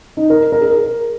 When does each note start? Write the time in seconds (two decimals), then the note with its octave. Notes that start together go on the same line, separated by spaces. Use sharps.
0.17 D#4
0.30 A#4
0.52 A#4
0.61 G#4
0.70 A#4